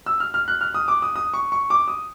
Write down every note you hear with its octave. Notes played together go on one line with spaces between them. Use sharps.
E6
F6
F6
F#6
F6
D#6
D6
D#6
D#6
C#6
C#6
D6
D#6